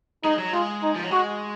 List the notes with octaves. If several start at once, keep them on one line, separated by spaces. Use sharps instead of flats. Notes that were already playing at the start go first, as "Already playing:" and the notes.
G#3 D#4
F#3
G#3 F4
D#4
F3
F#3
G#3 F#4